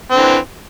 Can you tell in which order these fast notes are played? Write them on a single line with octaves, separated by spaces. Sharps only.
C4 D3 E3